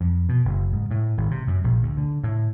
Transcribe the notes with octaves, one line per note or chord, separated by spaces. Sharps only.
F2
B2
F#1
G#2
A2
G#1
C3
F#2
A#1
D2
D3
A2